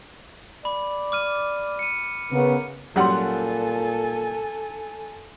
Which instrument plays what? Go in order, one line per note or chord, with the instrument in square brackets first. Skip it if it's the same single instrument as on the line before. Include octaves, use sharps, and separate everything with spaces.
[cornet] D5 [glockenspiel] B5
[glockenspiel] D6 F6 D#7
C#7 D#7
[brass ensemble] C#3 B3 [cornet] A#4
[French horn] A#2 [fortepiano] F#3 G3 F#5 [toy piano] C#4 C6 [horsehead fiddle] A4 G#5